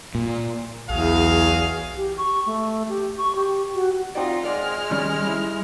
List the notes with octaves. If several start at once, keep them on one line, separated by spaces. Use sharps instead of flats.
A#2
B1 E2 F#4 G#4 F5
G4
C#6
A3
G4
C#6
G4
F#4
C4 D#4 F4 F#4 D5
G#3 D5 F6
D#3 G3 C#4 D5
G3 E4